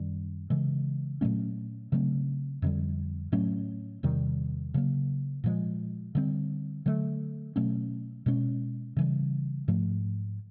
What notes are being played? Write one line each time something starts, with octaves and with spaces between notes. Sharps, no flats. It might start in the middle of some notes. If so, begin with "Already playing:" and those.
Already playing: F#2 D#3 G3
C#3 E3 G#3
A#2 F#3 A3 C#4
C#3 F#3 A3 C4
F2 D3 G3
A2 F#3 A3 C#4
E2 C3 D#3 G3
C#3 F#3 A#3
A#2 F3 G#3
D3 G3 C4
D3 F#3 A3
B2 F#3 A3 C#4
B2 G#3 C#4
C#3 E3 G3
G#2 F3 A3